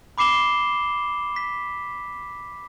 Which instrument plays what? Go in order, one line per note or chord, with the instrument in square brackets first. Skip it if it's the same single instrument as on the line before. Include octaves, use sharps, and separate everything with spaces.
[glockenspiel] B5 D6 C7 E7 G7
B6